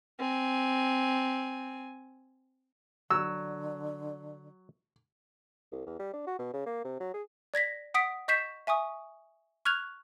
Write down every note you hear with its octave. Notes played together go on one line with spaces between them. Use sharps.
C4 G#5
D3 F#3 E6
C2
E2
G3
D4
F#4
B2
C#3
A#3
C3
F#3
G#4
D5 G#6 A#6 B6
F#5 D#6 B6 D7
D#5 C#6 G6 B6 C7 E7
E5 G#5 C#6 D#6
C#6 F6 F#6 G#6 F7